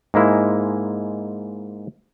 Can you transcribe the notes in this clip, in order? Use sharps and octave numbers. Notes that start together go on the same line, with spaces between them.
G#2 G#3 A#3 E4